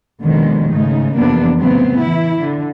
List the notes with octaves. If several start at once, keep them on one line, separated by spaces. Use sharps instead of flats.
D#2 B2 D3 D#3 F3 G#3
G#2 C#3 A3 D#4
F2 C3 E3 A#3 B3 D4
A2 C#3 F#3 B3 C4
E3 E4
D3